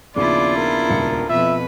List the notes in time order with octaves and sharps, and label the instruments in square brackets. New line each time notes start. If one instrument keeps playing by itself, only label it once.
[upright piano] D#2 C#3 F3 [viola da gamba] B3 D4 [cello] E4 F4 [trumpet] D5
[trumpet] A#4
[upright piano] D#1 C#2 C#7
[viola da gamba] F2 B2 B4 [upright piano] F3 [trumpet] E5